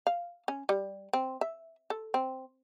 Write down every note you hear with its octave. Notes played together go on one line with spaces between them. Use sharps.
F5
C#4
G3
C4
E5
A4
C4